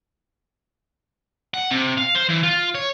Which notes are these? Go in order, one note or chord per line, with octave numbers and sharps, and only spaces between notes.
F#5
C3
F5
C5
E3
F4
C#5